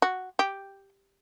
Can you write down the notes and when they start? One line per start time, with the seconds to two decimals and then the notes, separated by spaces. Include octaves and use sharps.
0.02 F#4
0.39 G4